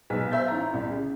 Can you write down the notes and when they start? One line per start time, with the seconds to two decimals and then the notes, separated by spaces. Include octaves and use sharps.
0.10 B1 G#3 B3 B6
0.31 C5 E5 F5 G6 A6
0.48 A1 A#5
0.74 C2
0.90 C#3